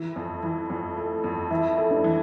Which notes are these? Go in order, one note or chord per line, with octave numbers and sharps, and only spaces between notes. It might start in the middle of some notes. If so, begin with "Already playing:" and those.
Already playing: E3 E4
F2
E3
F2
A3
F2
E3 E4
A3
D4
E3